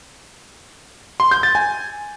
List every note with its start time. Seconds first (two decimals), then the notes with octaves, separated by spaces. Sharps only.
1.20 C6
1.31 G6
1.43 A6
1.55 G#5